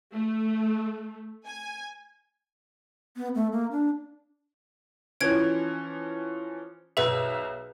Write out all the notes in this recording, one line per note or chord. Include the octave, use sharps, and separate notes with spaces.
A3
G#5
B3
A3
A#3
D4
E3 F3 C#4 G#6 D7
B1 G#4 B4 E5